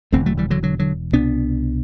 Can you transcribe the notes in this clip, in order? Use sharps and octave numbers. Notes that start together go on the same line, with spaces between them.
E1 E2 D3 A3 C4
F#3 A3
E3 G3
D3 F#3
D3 F#3
D3 F#3
C2 B2 B3 D4